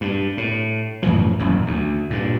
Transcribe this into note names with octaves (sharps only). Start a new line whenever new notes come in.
G2
A2
F#2 A2 E3 F3
D#1 F#2 A2
D2
G2 A#2